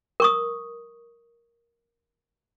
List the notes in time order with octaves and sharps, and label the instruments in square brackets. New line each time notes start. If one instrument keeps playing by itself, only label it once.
[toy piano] A#4 C#6 D#6